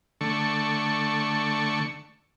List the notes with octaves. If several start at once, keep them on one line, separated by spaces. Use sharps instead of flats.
D3 A3 C#6